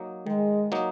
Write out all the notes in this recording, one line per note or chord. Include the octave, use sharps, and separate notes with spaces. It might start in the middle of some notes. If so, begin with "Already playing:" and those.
Already playing: F#3 A#3 D#4
D#3 G#3
F#3 A#3 D#4